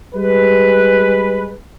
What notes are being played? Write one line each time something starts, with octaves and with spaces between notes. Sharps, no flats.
G3 G#3 B4